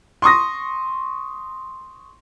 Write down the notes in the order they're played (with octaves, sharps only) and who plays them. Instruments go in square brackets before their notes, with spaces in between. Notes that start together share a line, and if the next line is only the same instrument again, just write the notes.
[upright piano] C6 C#6 D#6 A#6